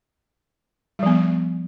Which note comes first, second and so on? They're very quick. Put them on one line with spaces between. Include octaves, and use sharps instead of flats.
G3 F3 B3